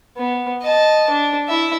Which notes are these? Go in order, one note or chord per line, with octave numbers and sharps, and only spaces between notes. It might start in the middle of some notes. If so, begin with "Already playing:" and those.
B3
D#5 A5
D4
E4 E5